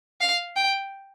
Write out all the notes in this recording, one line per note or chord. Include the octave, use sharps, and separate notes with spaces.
F5
G5